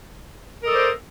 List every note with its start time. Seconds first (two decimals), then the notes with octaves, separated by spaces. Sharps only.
0.62 A#4
0.65 D#5
0.68 A4
0.71 D5
0.73 C5